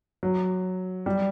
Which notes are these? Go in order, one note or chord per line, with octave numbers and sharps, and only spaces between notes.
F#3
G3